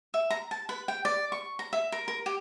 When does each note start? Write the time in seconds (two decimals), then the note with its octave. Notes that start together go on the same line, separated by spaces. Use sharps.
0.14 E5
0.30 A#5
0.51 A5
0.69 B4
0.88 G5
1.05 D5
1.32 C#6
1.59 A#5
1.73 E5
1.92 A#4
2.08 A#4
2.26 G4